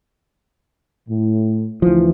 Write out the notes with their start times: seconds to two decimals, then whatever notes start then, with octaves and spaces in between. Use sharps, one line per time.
1.09 A2
1.82 D2 E3 F3